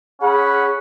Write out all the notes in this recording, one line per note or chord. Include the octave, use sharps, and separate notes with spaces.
C#4 G#4 F#5 B5